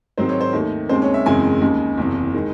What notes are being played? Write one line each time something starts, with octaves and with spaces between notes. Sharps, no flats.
G#2 D#3 F#3 C4 C5
C#5
C5
D#2 D#3 A3
D#2 C#3 G#3 C4 C5
C#5
E5
F#1 E2 C#3 G#3 C4 G#5
D#2 C#3 G#3
F#1 E2 C3
D#3 G#3